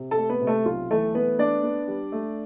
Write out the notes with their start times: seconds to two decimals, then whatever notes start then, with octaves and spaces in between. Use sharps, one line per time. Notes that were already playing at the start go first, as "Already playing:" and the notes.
Already playing: C3
0.11 A4 A5
0.18 A3
0.30 B3 B4
0.41 C3
0.47 A3 A4
0.65 B1 F4
0.91 E3 A3 A4
1.15 A3 B3 B4
1.39 B3 D4 D5
1.63 B3
1.88 G3
2.12 A3